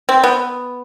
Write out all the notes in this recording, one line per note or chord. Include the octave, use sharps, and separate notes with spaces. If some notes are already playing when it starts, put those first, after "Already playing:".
C4
B3